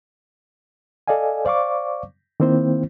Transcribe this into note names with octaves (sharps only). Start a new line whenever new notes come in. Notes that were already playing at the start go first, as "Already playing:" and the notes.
A4 D5 D#5 F5 G#5
C5 D5 F5 C#6 D6
D#3 A#3 C4 E4 C5